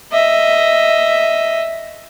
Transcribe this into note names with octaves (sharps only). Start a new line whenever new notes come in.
D#5 E5